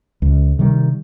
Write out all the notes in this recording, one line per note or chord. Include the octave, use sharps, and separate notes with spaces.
C#2
C3 D#3 G3